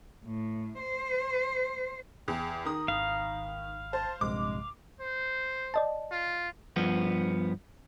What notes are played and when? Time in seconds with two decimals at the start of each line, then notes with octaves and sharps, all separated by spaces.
0.23 A2
0.78 C5
2.28 E2 G#4 G5
2.65 D#3 A#4 A#5 D#6
2.88 G#1 F5 B5
3.93 C5 A5
4.21 A#1 G2 C3 G#3 D6
5.00 C5
5.74 D5 D#5 A5
6.12 F4
6.76 G2 F3 B3